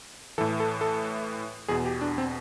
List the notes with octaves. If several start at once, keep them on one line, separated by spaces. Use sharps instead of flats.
A2 E3 A4
A4
A4
E2 B2 G#4
G4
D4
C4